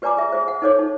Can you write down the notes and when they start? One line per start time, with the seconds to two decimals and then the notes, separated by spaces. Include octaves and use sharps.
0.02 G4 B4 D5 G#5 A#5 D6
0.17 G#4 E5
0.32 G#4 C5
0.48 F#5
0.62 D#4 A4 C5 C#5 D6
0.79 D#4